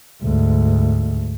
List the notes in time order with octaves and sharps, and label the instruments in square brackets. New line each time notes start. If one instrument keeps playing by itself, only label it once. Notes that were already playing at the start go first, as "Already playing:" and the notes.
[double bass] D2 G#2